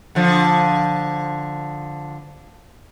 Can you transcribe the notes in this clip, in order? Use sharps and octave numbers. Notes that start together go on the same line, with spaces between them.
D3 F3